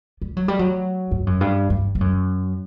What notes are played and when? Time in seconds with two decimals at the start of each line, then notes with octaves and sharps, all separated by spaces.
0.22 G3
0.37 F#3
0.48 G3
0.59 F#3
1.11 G2
1.27 F#2
1.41 G2
1.70 G2
1.95 G2
2.01 F#2